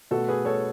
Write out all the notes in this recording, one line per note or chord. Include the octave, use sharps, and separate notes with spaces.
B2 A3 F#4 A4
G#4 B4
A4 C#5